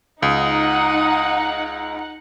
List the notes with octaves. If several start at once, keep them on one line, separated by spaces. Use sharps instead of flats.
C#2 D#4 F#5 D#6